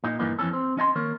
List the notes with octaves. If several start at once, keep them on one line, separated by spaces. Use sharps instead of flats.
A#2 D#4
G2 A#2 D3 E3 A#3 D#4
F2 E3 C#4 A4
C4
C#4 D#5 G#5 C6
D#3 A#3 A#4 C#5